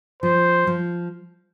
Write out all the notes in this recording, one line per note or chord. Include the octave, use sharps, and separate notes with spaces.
F3 C5
F3